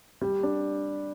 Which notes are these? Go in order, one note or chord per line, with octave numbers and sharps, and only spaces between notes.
G3
D4